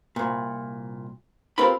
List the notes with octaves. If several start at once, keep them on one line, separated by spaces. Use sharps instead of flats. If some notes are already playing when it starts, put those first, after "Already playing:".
C2 A#2
C4 F4 G4 A#4 B4 B5